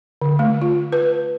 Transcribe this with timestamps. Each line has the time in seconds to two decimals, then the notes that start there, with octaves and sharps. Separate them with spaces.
0.21 D3
0.39 A3
0.62 F4
0.92 B4